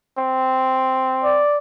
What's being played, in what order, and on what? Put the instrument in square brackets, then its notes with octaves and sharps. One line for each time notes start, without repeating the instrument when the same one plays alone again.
[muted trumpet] C4
[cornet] D5